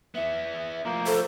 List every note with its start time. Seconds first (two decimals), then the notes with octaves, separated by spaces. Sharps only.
0.15 B3 E4 E5
0.86 F3 A3 A#3
1.06 A4 C5